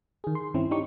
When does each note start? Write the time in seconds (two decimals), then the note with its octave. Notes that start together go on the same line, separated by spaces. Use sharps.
0.24 D#3 G#4
0.35 C6
0.54 G2 D#3 C4 C#4 E4
0.71 D4 D#4 G4 C#6